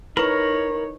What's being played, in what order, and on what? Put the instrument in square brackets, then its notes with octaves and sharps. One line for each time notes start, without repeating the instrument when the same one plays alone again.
[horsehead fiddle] D#4 C#5 [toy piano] E4 B4 C#6 [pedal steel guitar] A#4 B5